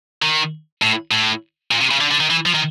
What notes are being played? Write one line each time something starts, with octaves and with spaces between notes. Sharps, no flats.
D#3
A2
A2
A#2
C3
C#3
D3
D3
D#3
E3
F3
D#3